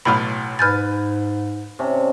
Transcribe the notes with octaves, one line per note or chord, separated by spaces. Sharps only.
B1 A2 F5 B5
G#2 B4 G#5 F6 G6 A6
C3 C#4 D4